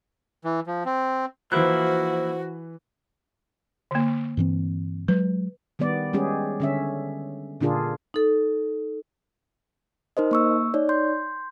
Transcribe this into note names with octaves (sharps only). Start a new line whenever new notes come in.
E3
F3
C4
E3 F3 A#3 E4 F#4 B4 C5 F#6
D3 A#3
G2 E3 C4
F#3 G#3 B4
D#3 G3 B3 D5
G3 G#3 C#4 G4 G#4
D3 C#4 E5
A#2 D3 D4 F4 G#4 A#4
D#4 A4
D#4 A#4 C5 D#5
A#3 C#6 E6
D#4 C#5 D5
C6 G6